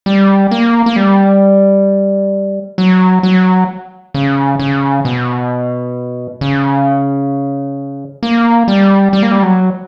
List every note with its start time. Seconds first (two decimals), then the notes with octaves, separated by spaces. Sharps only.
0.06 G3
0.51 A#3
0.86 A#3
0.96 G3
2.78 F#3
3.23 F#3
4.14 C#3
4.59 C#3
5.05 B2
6.41 C#3
8.23 A#3
8.68 G3
9.13 G3
9.23 A#3
9.31 G3
9.43 F#3